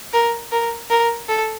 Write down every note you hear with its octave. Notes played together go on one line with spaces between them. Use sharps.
A#4
A#4
A#4
A4